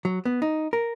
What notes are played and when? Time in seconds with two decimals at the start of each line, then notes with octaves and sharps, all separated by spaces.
0.05 F#3
0.25 B3
0.42 D#4
0.73 A#4